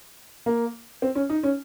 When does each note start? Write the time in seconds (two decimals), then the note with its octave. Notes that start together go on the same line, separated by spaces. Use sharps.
0.46 A#3
1.02 C4
1.15 C#4
1.29 D#4
1.43 C#4